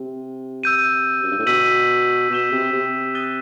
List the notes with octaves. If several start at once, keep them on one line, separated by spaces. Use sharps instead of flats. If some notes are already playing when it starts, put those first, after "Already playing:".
Already playing: C3
E6 G6 D#7
F#2
G2
A2
B2 E6 B6 D#7 F#7
B2 G6 B6 E7 G7
C3
C3
D#6 F#6 A6 D#7 G7